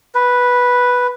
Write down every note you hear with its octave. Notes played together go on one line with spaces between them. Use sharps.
B4